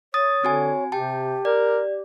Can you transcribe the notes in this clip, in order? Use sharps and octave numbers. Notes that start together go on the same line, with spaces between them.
C#5 D#6 A6
D3 C4 F#4 G#5
C3 G4 G5 A5
A#4 D5